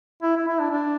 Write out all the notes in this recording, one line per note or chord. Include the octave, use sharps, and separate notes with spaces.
E4
E4
E4
D4
D4